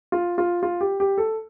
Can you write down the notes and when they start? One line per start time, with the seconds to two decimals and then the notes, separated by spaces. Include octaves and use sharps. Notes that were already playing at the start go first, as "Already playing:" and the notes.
0.12 F4
0.38 F4
0.63 F4
0.81 G4
1.00 G4
1.18 A4